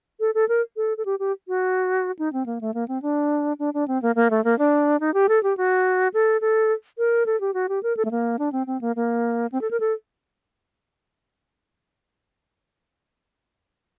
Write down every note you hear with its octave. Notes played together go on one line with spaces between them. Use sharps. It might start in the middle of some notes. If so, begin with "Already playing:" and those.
A4
A4
A#4
A4
A4
G4
G4
F#4
D#4
C4
A#3
A3
A#3
C4
D4
D4
D4
C4
A#3
A#3
A3
A#3
D4
D#4
G4
A4
G4
F#4
A4
A4
A#4
A4
G4
F#4
G4
A#4
A4
A3
A#3
D4
C4
C4
A#3
A#3
C4
A4
A#4
A4